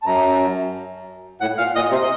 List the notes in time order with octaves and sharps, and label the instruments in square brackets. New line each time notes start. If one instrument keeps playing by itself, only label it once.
[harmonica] A5
[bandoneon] F#2 [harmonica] A#5
[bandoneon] A2 [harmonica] F#5
[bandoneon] A#2 [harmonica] F5
[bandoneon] A#2 [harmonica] D#5
[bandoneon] C3 [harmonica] C5
[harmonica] D#5